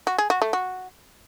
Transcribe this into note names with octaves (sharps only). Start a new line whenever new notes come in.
F#4
G#4
F#4
A3
F#4